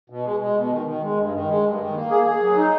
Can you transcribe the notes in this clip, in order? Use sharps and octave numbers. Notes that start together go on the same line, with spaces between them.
B2
G#3
G#3
B2
D#3
D#3
G#3
G2
D#3
G#3
G2
D#3
A#3
G#4
G#4
F#3
D#4